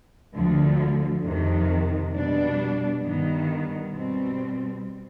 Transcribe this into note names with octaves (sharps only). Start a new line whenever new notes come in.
D2 D3 F3
F2 C3 D#3
B2 G3 D4
G2 D#3 G3 B3
B2 G3 C4